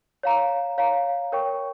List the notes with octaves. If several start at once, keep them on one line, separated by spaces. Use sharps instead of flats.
C#5 F5 A#5
C#5 F5 A#5
A#4 C#5 G5 C#6